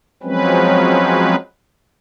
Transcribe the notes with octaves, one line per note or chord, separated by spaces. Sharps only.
F3 F#3 G#3 C4 C#4 B4